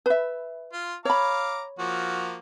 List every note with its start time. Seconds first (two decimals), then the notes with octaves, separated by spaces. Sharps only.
0.06 B4 E5
0.73 F4 C6
1.05 C#5 F5 A#5 B5 D6
1.79 F3 A#3 F#4